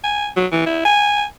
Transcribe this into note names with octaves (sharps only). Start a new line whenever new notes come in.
G#5
F#3
E3
E4
G#5